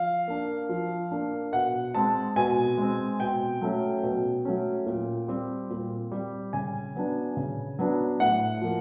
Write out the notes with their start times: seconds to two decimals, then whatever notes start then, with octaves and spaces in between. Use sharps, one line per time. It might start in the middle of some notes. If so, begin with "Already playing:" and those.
Already playing: F3 F5
0.28 A#3 D4
0.69 F3
1.11 A#3 D4
1.53 B2 F#5
1.95 G#3 C4 A5
2.36 B2 G#5
2.77 G#3 C4
3.20 B2 G5
3.61 F#3 A3 C#4
4.03 B2
4.45 F#3 A3 C#4
4.86 A#2
5.28 G3 C4
5.70 A#2
6.12 G3 C4
6.53 C#3 G#5
6.95 F#3 B3 D4
7.37 C#3
7.79 F#3 B3 D4
8.20 A2 F#5
8.62 F3 A#3